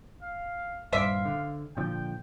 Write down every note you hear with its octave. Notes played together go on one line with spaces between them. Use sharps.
F5
D#1 G2 C5 D5 E5 F5
D3
A#2 D3 F3 G5